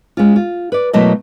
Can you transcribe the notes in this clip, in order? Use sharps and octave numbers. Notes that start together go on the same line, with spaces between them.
G#3 C#4 F4
F4
B4 D5
B2 F#3 A3 A#3 E4 D#5